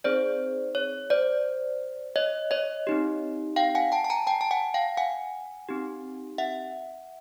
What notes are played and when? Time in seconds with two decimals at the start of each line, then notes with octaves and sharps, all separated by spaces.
0.04 C4 D#4 G#4 C5 D5
0.75 C#5
1.10 C5 D5
2.16 C#5 D#5
2.51 C#5 D#5
2.87 C4 D#4 G4
3.56 F5 G5
3.75 F#5 G#5
3.92 G5 A5
4.04 A5
4.10 G#5 A#5
4.27 G5 A5
4.41 A5
4.51 F#5 G#5
4.74 F5 G5
4.97 F#5 G#5
5.69 C4 D#4 G4
6.38 E5 F#5